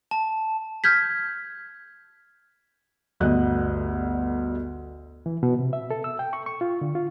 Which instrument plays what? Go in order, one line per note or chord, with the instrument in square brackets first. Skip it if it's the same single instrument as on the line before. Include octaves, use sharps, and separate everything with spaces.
[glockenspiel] A5
[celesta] F6 G6 G#6 B6
[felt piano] G1 D2 D#5 F#6
[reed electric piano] E3
B2
C3
E5
A4
E6
G5
C#6
C#6
F4
D3
F4